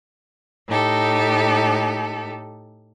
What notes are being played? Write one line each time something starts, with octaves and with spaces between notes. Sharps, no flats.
A2 D#4 G4 A4